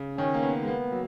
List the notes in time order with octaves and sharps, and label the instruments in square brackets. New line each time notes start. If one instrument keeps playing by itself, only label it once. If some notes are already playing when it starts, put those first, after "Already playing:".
Already playing: [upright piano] C#3
[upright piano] D#3 [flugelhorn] C#4
[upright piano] A#3
B3
G#3
[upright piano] A#3 [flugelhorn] B3
[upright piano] F#3